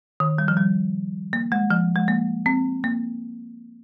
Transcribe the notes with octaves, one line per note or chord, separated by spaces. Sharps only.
D#3
G3
F3
G3
A#3
G#3
F3
G#3
A#3
C4
A#3